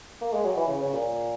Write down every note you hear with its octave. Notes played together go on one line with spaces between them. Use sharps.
A#3
G#3
F#3
E3
C#3
C#3
A#2